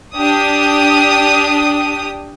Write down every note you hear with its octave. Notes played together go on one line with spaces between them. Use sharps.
D4 G4 D#6